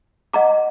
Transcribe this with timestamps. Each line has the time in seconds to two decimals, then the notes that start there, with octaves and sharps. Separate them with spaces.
0.34 D#5 F#5 A#5 D6